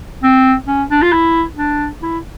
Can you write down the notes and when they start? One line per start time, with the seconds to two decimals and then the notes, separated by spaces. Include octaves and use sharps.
0.23 C4
0.67 C#4
0.91 D4
1.02 F4
1.12 E4
1.57 D4
2.02 E4